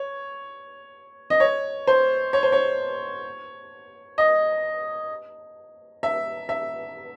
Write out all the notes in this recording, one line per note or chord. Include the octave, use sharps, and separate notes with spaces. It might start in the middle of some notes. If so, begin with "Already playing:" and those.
Already playing: C#5
D#5
C#5
C5
C#5
C5
C#5
D#5
E5
E5